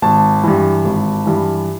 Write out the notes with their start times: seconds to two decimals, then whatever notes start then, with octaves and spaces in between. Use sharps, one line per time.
0.02 G#1 A5
0.44 G2 E3
0.85 G#1
1.26 G2 E3